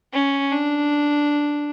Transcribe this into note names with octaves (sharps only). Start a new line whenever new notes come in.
C#4
D4